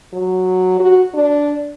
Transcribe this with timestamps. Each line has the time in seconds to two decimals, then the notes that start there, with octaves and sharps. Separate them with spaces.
0.14 F#3
0.80 F#4
1.14 D4